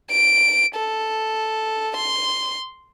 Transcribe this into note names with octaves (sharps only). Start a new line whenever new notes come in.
D7
A4
C6